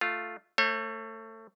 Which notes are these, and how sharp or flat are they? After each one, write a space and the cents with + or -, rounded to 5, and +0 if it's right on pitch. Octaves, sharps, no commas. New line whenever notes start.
A3 +0 F4 +0
A3 +25 C#5 -40